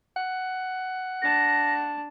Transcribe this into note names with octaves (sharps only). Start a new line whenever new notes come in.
F#5
D4 A5 A#6